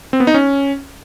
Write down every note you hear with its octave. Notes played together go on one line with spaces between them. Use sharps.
C4
B3
D#4
C#4